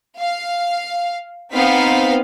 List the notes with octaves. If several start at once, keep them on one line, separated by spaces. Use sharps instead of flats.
F5
B3 C4 D#4 F5 B6